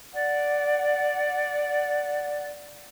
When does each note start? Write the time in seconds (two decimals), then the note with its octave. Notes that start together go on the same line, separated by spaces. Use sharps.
0.14 D5 F#5